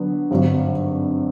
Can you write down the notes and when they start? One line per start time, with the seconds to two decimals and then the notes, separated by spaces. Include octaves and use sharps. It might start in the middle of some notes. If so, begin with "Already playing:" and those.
Already playing: D3 F#3 B3
0.31 G#1 G2 D3 F#3